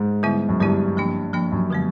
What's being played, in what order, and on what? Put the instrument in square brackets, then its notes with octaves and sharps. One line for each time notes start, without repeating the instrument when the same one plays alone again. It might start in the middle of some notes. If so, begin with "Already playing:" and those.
Already playing: [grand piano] G#2
[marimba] D3 G3 B3 E4
[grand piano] F#2
[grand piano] G2 [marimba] D3 G3 B3 E4
[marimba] F3 A#3 D4
F3 A#3 D4
[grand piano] F#2
[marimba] D3 F3 G#3 B3